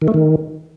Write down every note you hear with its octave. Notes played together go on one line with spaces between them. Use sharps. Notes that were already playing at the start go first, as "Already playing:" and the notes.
D#3
A3
D#3